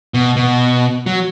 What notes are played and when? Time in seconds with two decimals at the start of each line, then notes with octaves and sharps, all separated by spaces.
0.14 B2
0.36 B2
1.06 F#3